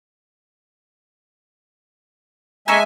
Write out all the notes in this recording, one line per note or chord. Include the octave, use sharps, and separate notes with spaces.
G#3 A#3 C#4 A4 E5 G#5